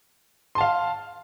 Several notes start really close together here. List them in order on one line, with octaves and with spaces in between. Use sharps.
C6 A5 F5